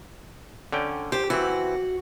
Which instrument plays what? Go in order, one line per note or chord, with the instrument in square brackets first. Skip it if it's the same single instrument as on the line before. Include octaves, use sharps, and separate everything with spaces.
[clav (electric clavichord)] D3 C#4 G5
[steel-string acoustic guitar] G4 [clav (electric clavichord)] C5
[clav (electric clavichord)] E3 C4 [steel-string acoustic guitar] F#4